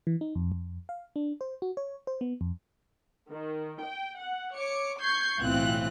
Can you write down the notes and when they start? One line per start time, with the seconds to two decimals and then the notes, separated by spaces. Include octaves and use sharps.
0.07 E3
0.21 D#4
0.35 F2
0.52 F2
0.89 F5
1.16 D4
1.41 C5
1.62 F#4
1.77 C#5
2.07 C5
2.21 B3
2.41 F2
3.31 D#3
3.82 G5
4.18 F#5
4.56 C#5 D6 C#7
5.00 C#6 G6 G#6 C7
5.40 B1 A2 E3 C4 F4 F#6